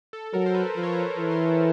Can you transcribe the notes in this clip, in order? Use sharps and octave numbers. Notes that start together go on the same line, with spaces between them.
A4
F#3 A#4
C5
B4
F3 C5
C#5
C5
C#5
E3
C5